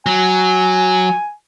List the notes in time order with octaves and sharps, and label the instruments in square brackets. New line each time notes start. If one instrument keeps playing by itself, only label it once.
[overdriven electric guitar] F#3 [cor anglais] G#5